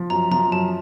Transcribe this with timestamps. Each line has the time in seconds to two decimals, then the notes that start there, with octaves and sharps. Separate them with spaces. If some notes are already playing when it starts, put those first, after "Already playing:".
Already playing: F3
0.10 F#2 A#5
0.31 F3 A#5
0.52 F#2 A5